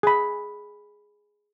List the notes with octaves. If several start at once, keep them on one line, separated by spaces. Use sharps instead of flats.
G#4 B5